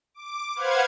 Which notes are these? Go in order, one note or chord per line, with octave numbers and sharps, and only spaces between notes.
D6
B4 C5 F5 F#5 G#6